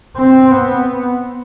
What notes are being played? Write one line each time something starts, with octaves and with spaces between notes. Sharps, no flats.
C4
B3